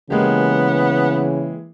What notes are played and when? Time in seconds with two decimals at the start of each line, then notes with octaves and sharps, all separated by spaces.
0.10 C#3 E3 G#3 A#3 B3 G4